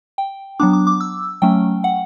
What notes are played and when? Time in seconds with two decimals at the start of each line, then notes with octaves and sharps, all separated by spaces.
0.18 G5
0.59 F#3 B3 D4 D6
0.73 D6
0.87 D6
1.01 E6
1.42 F#3 A3 C#4 G5
1.84 F#5